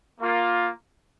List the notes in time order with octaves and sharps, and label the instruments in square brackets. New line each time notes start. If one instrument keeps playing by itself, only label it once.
[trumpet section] A#3 F4